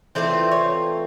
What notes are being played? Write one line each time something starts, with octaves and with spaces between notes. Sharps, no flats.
E3 A3 C4 F4 C5 D5
C#5